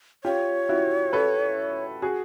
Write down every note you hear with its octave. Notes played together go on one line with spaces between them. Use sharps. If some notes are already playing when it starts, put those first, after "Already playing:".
F4 G4 C#5
E4 F#4
A4 B4
F#4 G#4